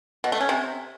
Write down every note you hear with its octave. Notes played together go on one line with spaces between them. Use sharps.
B2
A3
C#4
C3